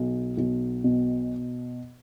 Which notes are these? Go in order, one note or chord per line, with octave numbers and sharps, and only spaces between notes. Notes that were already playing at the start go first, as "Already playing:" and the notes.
Already playing: B1
B1
B2